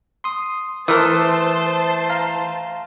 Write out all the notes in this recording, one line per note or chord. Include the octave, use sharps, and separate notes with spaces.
C6 D#6
E3 A3 A#4 C5 A5 C6 D#6
F5 A#5